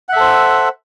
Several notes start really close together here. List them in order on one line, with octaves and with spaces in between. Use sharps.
F#5 E5 A4 C5